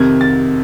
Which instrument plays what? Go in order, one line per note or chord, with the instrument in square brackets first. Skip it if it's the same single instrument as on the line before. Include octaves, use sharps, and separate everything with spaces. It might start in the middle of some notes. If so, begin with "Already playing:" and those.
Already playing: [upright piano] F2 C3 D#3 G#6
A6